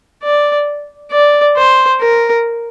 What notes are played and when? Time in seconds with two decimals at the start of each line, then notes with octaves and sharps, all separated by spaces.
0.23 D5
1.12 D5
1.57 C5
2.01 A#4